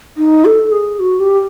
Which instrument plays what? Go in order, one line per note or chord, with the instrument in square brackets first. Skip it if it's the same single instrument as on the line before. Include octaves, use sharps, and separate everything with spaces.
[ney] D#4
A4
G#4
F#4
G4